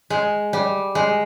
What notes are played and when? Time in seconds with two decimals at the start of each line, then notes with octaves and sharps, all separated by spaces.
0.10 G#3
0.53 G3
0.95 G#3